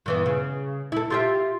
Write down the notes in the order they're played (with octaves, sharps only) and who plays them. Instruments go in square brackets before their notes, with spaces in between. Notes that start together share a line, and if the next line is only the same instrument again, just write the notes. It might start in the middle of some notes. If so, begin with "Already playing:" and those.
[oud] G2 E3 B3
C#3
E4 A4
F4 G4 E5